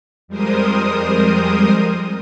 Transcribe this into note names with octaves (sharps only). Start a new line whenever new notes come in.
F2 G3 G#3 A#4 C5 D#6